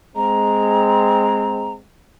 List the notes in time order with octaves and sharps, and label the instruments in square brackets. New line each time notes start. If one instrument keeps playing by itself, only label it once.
[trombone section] G#3 C4 [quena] A#5